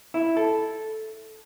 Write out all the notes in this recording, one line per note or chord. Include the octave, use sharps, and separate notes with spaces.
E4
A4